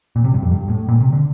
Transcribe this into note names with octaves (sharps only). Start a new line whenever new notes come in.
A#2
C3
G2
F2
G2
A2
A#2
C3
D3